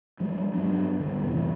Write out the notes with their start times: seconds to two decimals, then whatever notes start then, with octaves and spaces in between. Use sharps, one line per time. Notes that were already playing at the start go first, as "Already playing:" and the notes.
0.20 G2 F3 G3 G#3
0.54 G2 F#3 B3 D4
1.00 D1 D3 G3 B3
1.23 F2 A2 C3 E3